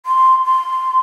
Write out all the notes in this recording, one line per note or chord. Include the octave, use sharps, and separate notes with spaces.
C6
C6